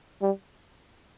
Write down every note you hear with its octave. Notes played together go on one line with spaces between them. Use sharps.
G3